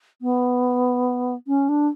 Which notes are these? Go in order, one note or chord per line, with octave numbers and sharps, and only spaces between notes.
B3
C#4
D4